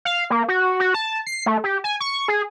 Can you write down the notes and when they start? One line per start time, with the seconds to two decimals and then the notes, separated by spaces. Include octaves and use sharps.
0.05 F5
0.30 A#3
0.48 F#4
0.80 F#4
0.94 A5
1.27 C7
1.46 A3
1.64 G4
1.84 G#5
2.00 C#6
2.28 G#4